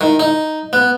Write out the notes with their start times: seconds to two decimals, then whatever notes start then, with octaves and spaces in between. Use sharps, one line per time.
0.01 D#3
0.20 D#4
0.73 B3